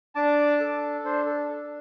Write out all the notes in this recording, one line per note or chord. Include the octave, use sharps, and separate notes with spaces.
D4 A5 D6
A4
D4 C5
A4
A4